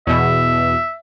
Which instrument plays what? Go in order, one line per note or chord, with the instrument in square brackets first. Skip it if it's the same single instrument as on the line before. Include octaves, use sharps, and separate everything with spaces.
[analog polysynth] E2 B2 [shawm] E5